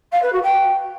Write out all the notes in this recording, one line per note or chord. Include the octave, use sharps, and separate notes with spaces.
F5
B4
F#4
G5